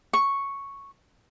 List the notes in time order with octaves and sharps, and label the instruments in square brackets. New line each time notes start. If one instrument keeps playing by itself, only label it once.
[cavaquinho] C#6